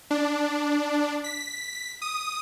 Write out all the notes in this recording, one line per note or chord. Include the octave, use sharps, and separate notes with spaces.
D4
B6
D#6